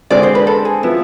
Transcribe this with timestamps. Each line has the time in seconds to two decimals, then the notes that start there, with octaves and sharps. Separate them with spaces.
0.10 D3 G#3 C4 D5
0.23 C5
0.35 B4
0.47 A4
0.65 G#4
0.83 F3 B3 E4